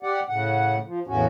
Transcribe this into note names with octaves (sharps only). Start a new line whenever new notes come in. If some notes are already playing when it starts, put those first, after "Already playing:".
G4 D5 F#5
A2 C#3 F#5
F3
E2 A2 C#3 C#4 F#4